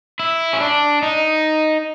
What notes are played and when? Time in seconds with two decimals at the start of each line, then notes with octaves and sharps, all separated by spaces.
0.19 E4
0.53 C#4
0.60 D4
1.03 D#4